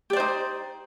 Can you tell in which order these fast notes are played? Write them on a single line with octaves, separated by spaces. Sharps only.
G4 D5 C5 D#4